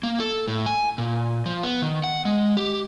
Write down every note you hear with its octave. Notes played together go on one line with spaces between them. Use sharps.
A#3
A4
A2
G#5
A#2
F3
B3
D#3
F#5
G#3
G4